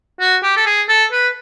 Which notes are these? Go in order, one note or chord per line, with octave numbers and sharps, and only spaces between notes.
F#4
G4
A4
G#4
A4
B4